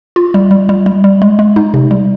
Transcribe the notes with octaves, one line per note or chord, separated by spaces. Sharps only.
F4
G3
G3
G3
G3
G3
G#3
G#3
D#4
C3
G3